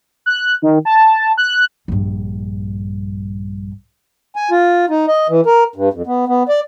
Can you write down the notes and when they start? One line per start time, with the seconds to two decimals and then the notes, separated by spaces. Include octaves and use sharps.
0.26 F#6
0.62 D#3
0.85 A5
1.38 F#6
1.88 A#1 G2
4.36 G#5
4.51 F4
4.90 D#4
5.07 D#5
5.29 E3
5.46 A#4
5.76 G2
5.93 F2
6.07 B3
6.28 B3
6.48 D5